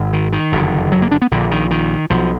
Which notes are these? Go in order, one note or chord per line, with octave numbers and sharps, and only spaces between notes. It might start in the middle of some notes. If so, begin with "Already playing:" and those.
Already playing: G#1 G#2
D#3
D#3
F#1 F2 D3
F#3
A#3
D4
B3
A#1 A#2 D3
D#3
D#3
B1 B2 F3